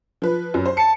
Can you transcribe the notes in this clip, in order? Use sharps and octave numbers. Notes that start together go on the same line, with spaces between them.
F3 B4
F#2
C5
A5 C#7